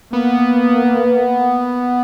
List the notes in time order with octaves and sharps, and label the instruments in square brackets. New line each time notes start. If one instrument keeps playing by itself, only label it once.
[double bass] A#3 [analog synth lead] B3